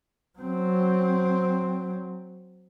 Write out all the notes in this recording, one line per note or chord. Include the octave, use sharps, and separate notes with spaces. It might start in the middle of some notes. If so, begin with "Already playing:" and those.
F#3 C4